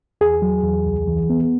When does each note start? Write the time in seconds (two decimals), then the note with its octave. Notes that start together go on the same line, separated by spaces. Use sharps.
0.21 E2 G#4
0.42 F#3
0.64 E2
0.86 C#2
1.07 E3
1.30 B3